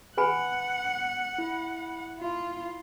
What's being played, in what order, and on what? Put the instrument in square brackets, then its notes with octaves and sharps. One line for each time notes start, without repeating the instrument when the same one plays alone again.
[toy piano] B4 G#5 B5 [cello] F#5
[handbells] E4
[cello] F4